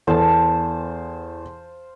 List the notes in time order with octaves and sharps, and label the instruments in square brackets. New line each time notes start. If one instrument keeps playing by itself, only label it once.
[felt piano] E2 B3 A4 [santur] C5 F5 A5